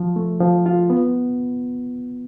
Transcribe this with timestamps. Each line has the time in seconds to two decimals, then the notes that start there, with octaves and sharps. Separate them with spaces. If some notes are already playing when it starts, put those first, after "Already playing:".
Already playing: F3
0.16 A3
0.40 F3
0.66 F4
0.90 B3